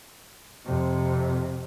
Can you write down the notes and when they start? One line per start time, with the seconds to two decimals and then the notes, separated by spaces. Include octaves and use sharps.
0.65 F2 C3